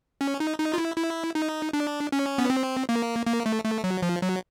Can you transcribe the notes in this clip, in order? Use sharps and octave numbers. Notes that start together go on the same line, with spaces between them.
C#4
D#4
D#4
F4
E4
E4
D#4
D4
C#4
B3
C4
A#3
A#3
A3
A3
F#3
F3
F#3